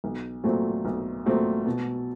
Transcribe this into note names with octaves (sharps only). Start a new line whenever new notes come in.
B1
A#2 F#3 A3 C4
B1
A#2 F#3 A3 C4
B2